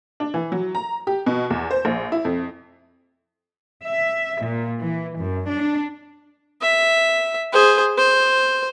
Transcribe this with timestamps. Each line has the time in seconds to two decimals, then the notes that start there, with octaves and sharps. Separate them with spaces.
0.20 D4
0.34 E3
0.52 F#3
0.75 A#5
1.07 G4
1.26 B2
1.50 E2
1.71 C5
1.85 A#1
2.12 E4
2.25 F2
3.84 E5
4.42 A#2
4.81 E3
5.19 F#2
5.50 D4
6.62 E5
7.53 G#4 C5
7.98 C5